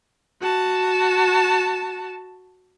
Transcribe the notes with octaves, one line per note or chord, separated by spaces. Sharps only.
F#4 A5